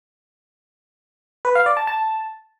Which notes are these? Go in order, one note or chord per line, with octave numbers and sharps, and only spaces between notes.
B4
F5
D5
A5
A5